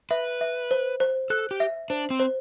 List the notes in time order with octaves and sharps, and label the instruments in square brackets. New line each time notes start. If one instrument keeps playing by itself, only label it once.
[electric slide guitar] B4 [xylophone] E5
[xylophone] E5
C5
C5
[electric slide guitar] A4 [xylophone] F#6
[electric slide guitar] G4
[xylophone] E5
[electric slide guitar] D4 [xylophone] C5
[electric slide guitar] C4
[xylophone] C5